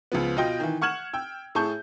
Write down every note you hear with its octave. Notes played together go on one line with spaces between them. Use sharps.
C#2 F3 B3
B2 F4 D#5 G5 G6
D#3 E3
F#5 C#6 F6 G#6 E7 F#7
G5 E6
A2 G#4 A5 C#6 G6